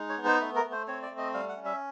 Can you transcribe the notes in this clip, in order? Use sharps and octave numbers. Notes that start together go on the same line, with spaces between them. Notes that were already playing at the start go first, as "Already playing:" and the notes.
Already playing: G#3 D#4
C#5
B3
C5
A3 B4
A#4
A3
C5
C4 C#5
D5
A3
D#5
G3 F5
F#5
C#4
E5